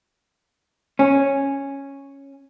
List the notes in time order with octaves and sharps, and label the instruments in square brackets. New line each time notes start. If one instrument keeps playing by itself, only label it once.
[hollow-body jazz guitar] C#4